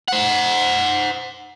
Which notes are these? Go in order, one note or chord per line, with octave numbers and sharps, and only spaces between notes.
C5 F#5